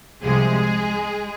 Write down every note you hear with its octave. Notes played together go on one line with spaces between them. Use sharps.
C2 C3 F3 G#3 G#4